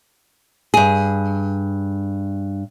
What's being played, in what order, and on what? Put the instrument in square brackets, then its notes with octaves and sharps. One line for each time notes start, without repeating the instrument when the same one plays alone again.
[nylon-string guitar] G2 G#4